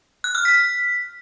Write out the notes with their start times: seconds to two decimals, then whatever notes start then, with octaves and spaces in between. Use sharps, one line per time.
0.24 F#6
0.35 F6
0.45 B6